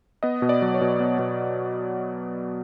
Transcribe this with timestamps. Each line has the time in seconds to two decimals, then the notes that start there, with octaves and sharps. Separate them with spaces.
0.23 B3 D#5
0.42 B2
0.49 D5
0.62 F#3
0.74 C#5
0.81 B2
1.00 B3
1.19 B2